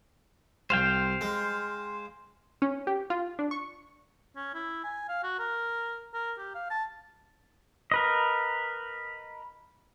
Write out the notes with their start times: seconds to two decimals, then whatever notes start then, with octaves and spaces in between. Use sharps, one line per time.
0.70 C2 C5 F5 G5
1.21 G#3
2.62 C#4
2.87 G4
3.10 F4
3.39 D4
3.51 C#6
4.36 C#4
4.54 E4
4.84 G#5
5.09 F5
5.23 F#4
5.39 A#4
6.14 A#4
6.38 G4
6.55 F5
6.71 A5
7.92 A#4 B4 D#5